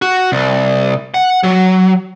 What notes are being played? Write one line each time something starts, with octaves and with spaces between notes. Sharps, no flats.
F#4
C2
F#5
F#3